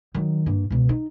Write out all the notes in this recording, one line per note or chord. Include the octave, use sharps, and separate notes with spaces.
D#3 F#3
G2 A#3
C#2 B2
D#4